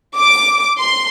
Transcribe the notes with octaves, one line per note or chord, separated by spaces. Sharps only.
D6
C6